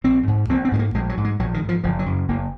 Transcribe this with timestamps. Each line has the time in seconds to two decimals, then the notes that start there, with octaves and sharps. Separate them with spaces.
0.04 A#1 C4
0.28 G#2
0.49 A#1 C4
0.65 C4
0.72 G#2 G#3
0.79 A#3
0.94 A#1 G#3
1.09 F#3
1.17 G#2
1.25 G#3
1.39 A#1 F#3
1.54 D#3
1.62 G#2
1.69 F3
1.84 F#1 F3
1.99 F#3
2.06 F#2 C#3
2.28 F#1 A#3